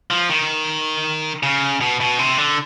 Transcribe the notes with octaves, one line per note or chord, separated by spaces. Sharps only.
F3
D#3
C#3
B2
B2
C3
D3